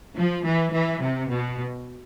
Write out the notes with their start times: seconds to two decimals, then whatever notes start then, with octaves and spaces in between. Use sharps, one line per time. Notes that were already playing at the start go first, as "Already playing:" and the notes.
0.17 F3
0.45 E3
0.73 E3
1.03 C3
1.31 B2